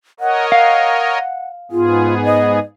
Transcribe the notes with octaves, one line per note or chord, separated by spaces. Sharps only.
A#4 C#5 D#5 F#5
F5 F#5
G#2 B3 F4 G#4
D#5